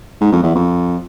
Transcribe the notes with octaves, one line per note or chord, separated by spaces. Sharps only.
G#2
F2
E2
F2